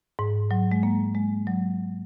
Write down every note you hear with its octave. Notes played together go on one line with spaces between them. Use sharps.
G#2
F#3
G#3
A#3
G#3
F#3